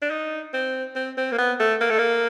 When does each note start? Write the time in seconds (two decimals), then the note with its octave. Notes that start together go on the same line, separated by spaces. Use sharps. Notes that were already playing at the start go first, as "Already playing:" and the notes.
0.02 D4
0.10 D#4
0.54 C4
0.96 C4
1.17 C4
1.32 A#3
1.38 B3
1.60 A3
1.81 A#3
1.90 A3
1.98 A#3